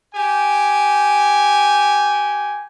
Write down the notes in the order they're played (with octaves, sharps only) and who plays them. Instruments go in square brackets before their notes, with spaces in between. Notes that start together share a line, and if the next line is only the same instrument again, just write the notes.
[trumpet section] G4 G#5